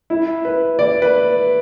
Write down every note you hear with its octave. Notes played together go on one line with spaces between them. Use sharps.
E4
B4
D5
B4